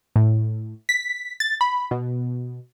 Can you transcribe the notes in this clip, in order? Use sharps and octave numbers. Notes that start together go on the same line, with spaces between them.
A2
B6
A6
B5
B2